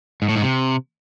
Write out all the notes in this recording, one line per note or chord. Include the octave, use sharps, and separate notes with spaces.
G#2
A2
G#2
C3